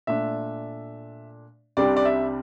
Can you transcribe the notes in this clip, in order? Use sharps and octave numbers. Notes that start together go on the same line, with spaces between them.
A#2 A3 D4 E5
C2 C3 G3 D4 D5
D5
E5